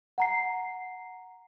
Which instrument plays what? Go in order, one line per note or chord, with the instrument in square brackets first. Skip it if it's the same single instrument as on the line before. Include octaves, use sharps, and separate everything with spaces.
[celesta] F#5 A#5 C7